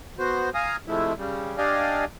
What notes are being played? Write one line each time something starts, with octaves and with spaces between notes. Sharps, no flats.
B3 F#4 C5
F5 G#5 A#5 D#6
C3 F3 G#3 A3 E4
C#3 G3
D4 G4 D5 D#5 F5 G#5